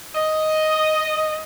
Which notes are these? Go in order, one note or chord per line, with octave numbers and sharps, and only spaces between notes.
D#5